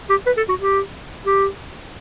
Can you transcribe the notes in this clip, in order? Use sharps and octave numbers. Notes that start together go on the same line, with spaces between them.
G4
B4
A4
F#4
G4
G4